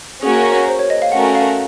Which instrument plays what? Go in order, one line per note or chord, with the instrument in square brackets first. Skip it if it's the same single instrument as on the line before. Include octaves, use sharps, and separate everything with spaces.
[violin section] A#3 C#4 F#4 A#4 [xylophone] G#4
[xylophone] C5
C#5
D#5
F5
[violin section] A3 C#4 F#4 A#4 [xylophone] F#5
[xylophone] F5